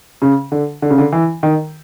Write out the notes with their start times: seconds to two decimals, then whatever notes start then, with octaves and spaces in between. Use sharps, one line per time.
0.22 C#3
0.52 D3
0.82 D3
0.90 C#3
0.98 D3
1.12 E3
1.43 D#3